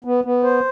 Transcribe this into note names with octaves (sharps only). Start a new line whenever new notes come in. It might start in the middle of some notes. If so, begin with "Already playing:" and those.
B3
B3
C5